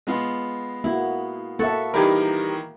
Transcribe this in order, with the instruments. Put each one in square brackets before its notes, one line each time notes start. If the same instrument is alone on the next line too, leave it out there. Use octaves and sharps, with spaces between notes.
[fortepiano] G#3 B3 F4
[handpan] A#3 F#4 [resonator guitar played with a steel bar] E4
[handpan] A#3 E5 [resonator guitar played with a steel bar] F#4 A4
[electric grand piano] D#3 E3 A#4 [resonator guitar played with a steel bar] G3 G4 G#4